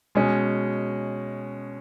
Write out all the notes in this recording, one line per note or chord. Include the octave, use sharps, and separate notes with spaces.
B2 G#3 C#4